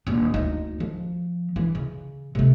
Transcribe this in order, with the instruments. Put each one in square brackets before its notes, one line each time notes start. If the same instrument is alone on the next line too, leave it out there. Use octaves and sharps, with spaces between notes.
[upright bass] D#1 D4
D2 D#4
F3
E3
C#3
C3 A3